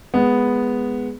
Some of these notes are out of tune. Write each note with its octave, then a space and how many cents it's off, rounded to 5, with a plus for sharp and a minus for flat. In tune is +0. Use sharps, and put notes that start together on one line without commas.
G#3 +0 B3 +0